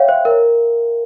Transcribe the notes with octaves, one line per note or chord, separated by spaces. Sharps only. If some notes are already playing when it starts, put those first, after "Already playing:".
Already playing: C#5 E5 F5 G5
C5
A#4